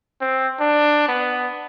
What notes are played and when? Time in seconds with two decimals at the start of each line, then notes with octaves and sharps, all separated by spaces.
0.21 C4
0.60 D4
1.08 B3